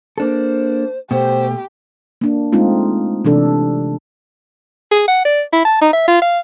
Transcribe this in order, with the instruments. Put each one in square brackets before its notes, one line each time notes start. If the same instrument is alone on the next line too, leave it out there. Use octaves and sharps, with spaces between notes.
[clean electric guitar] A#3 D4 A4 [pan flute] C5
[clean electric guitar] B2 A3 [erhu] G4 [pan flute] C5
[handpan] A#3 D4
G#3 A3 C4 D#4 F4
C3 E3 D4 A4
[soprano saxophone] G#4
F#5
D5
E4
A5
D#4
E5
F4
F5